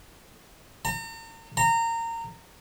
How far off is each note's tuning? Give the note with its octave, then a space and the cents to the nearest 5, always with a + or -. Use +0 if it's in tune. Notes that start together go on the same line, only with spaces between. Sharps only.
A#5 -45
A#5 -25